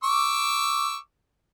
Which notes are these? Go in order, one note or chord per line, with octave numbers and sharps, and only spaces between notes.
C#6 D6 E6